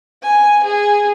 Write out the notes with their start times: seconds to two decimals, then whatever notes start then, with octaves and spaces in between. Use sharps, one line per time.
0.22 G#5
0.64 G#4